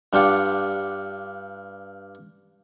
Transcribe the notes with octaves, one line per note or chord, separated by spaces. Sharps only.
G2 D4 F4 G4 F#5